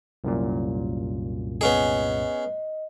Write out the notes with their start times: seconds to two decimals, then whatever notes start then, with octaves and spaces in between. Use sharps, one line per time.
0.24 C2 F#2 A#2
1.61 B3 C#4 G#4 D#5